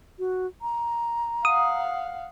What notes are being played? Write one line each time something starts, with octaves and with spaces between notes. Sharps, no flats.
F#4
A#5
F5 F#5 D#6